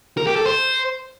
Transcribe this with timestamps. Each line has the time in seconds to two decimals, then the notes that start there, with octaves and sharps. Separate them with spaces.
0.17 A#4
0.27 G4
0.36 A4
0.45 C5